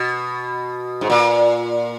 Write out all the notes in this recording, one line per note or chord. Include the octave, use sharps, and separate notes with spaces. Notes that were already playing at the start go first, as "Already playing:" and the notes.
Already playing: B2
G#2
A#2